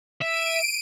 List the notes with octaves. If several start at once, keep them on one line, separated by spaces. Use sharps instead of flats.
E5 D7 D#7